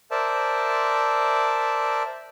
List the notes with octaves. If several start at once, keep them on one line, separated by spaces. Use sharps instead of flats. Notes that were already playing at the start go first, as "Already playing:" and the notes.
A#4 C5 D5 E5 A5